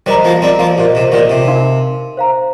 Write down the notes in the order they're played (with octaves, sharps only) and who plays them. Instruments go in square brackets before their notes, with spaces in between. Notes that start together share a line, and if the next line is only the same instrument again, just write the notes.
[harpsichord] D#3 G3 [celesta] C5 D#5 A#5
[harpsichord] F3 A#3
G3 C4
F3 A#3
[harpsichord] A#2 [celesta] G4 C5 D#5
[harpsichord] C3
A#2 D#3
C3
[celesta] D#4 A#4 F5 C6
C5 F5 A#5